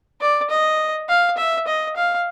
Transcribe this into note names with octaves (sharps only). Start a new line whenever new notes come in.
D5
D#5
F5
E5
D#5
F5